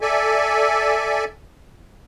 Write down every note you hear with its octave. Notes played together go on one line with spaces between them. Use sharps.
A4 D5 E5 G#5